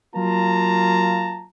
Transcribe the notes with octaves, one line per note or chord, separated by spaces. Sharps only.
F#3 A#3 F4 A5 A#5